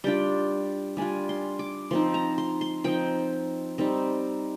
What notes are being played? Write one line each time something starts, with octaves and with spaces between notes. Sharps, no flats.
G3 D4 F4 G5
G3 D4 F4 G#5
C6
D6
F3 C4 D#4 C6
A#5
C6
C6
F3 C4 D#4 G5
G3 C4 D#4